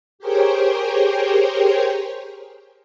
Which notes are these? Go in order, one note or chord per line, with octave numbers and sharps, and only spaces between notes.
G4 G#4 A#4 C5 C#5 G5